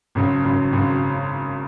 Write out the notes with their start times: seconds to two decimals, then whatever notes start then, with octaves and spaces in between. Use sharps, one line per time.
0.15 G#1 F#2 C#3 F#3
0.44 G#1 F#2 C#3 F#3
0.72 G#1 F#2 C#3 F#3